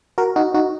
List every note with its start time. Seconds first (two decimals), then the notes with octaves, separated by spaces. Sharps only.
0.18 F#4 A#4
0.36 D#4 F#4
0.54 D#4 F#4